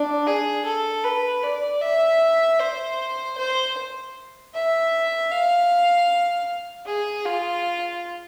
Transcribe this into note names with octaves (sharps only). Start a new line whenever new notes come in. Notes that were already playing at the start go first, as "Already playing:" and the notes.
Already playing: D4
G#4
A4
B4
D5
E5
C5
C5
E5
F5
G#4
F4